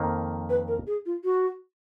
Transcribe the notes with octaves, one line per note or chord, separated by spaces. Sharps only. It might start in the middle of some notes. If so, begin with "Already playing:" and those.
Already playing: F2 D#3 A#3
B4
A#4
G#4
F4
F#4